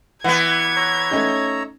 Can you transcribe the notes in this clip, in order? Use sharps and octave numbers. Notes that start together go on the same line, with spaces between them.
E3 B3 F#5 G#6
C#5 A#5 E6
A3 C#4 D#4